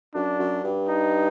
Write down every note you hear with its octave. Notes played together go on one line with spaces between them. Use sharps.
F#2 D4
F#2
G2
D#4